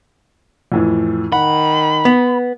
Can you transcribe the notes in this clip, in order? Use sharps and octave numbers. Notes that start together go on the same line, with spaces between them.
F2 A2 E3
D#3 F#5 B5
B3